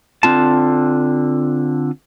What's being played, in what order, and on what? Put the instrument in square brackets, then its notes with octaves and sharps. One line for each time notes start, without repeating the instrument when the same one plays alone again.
[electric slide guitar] D3 C4 F4 A5